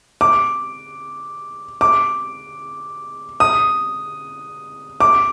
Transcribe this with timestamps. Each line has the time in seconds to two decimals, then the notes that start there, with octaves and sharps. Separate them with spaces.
0.21 D6
1.81 D6
3.40 D#6
5.00 D6